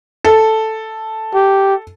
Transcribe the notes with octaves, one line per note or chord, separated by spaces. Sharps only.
A4
G4